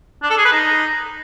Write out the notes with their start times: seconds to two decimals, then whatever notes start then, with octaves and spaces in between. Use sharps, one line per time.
0.23 D4
0.30 A4
0.37 G#4
0.45 B4
0.52 D#4